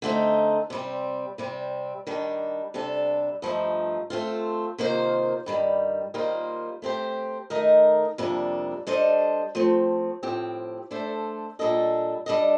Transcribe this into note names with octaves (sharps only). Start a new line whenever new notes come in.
D3 A3 C4 D#4
C3 G3 C4
C3 G3 C4
D#3 G3 D4
C3 G3 D4 A4
G2 F3 A3 D#4
A3 C4 F4
C3 D#3 A#3 F4 C5
G2 D#3 G3
D#3 G3 A#3 F4 C5
A3 C4 G4 C5
D#3 A3 D#4 A#4 D#5
F2 C3 G3 A#3 D4
G3 D4 A4 C5 D#5
F3 A3 C4
A2 F3 C4 G4
A3 D4 A4 C5
A#2 G3 D4 A4 D#5
G3 D4 A4 D#5